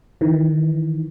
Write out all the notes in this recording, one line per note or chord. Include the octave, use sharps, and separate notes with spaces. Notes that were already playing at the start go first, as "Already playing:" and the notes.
D#3 E3